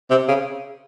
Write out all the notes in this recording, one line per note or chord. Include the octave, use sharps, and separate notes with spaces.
C3
C#3